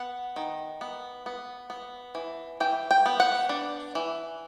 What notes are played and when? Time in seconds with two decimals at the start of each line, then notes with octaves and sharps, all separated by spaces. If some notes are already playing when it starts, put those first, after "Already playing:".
Already playing: B3 F#5
0.36 D#3
0.81 B3
1.26 B3
1.70 B3
2.15 E3
2.60 E3 G5
2.91 G5
3.06 B3
3.20 F#5
3.49 D4
3.95 E3